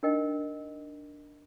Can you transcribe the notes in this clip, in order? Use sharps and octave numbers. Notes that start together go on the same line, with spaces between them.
D4 D#4 A#4 D#5 G5